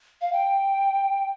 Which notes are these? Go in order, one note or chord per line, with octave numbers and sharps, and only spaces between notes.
F5
G5